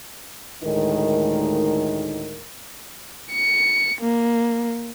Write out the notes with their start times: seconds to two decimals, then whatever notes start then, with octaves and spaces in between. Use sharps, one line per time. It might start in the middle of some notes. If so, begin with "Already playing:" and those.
0.63 D2 A2 D#3 G#3 D#4 A#4
3.32 C#7
4.01 A#3